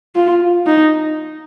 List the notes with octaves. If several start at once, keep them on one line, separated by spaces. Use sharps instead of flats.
F4
D#4